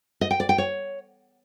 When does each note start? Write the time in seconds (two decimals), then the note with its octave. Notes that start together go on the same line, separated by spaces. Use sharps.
0.21 D#5
0.31 G5
0.40 D5
0.49 G5
0.58 C#5